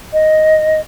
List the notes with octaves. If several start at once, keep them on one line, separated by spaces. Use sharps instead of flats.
D#5